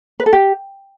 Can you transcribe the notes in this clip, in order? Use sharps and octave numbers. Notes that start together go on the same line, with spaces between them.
B4
A4
G4